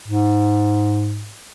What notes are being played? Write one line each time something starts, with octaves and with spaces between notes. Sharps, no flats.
G#2